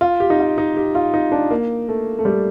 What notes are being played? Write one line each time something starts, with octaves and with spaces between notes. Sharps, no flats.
F4
G4
D#4
F4
D#4
G4
F4
D#4
D4
A#3
A3
A3
G3